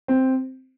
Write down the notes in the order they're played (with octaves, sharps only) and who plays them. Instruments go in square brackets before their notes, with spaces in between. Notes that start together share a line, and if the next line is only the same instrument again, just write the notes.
[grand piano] C4